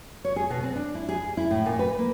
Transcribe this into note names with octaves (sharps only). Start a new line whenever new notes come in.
C#5
G#4
B2
C4
D4
E4
G#4
E4
A2
A#2
B4
A#3